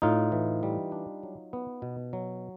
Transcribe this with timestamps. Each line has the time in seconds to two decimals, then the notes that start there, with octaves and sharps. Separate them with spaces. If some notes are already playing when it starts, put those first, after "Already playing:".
0.02 A2 D#4 F4
0.32 E3
0.63 G3
0.92 D4
1.23 F#3
1.53 B3
1.82 B2
2.13 F#3